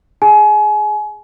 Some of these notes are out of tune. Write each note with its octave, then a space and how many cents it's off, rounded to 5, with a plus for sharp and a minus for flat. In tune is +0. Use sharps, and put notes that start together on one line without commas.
G#4 +0 G#5 +30